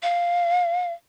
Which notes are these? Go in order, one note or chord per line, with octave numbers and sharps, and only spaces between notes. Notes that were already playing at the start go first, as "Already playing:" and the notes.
F5